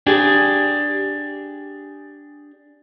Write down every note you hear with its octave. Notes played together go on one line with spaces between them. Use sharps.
D4 G4 G#4